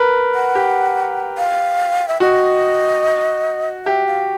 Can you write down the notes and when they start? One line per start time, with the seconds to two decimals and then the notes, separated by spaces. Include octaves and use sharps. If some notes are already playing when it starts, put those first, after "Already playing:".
Already playing: A#4 B4
0.35 F#5
0.55 G4
1.38 F5
2.08 E5
2.20 F#4 D#5
3.85 G4 E5
4.07 F5